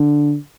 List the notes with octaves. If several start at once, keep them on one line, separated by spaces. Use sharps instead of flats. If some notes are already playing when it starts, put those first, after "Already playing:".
Already playing: D3